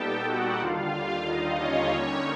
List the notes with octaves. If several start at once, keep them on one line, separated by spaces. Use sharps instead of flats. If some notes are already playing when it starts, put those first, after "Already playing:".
Already playing: A#2 G3 B3 D#4 G4 A4 G5 A5
F#4 F#5
D#2 D3 G3 F4 F5
D#4 D#5
C#4 C#5
D3 G3 A#3 D#4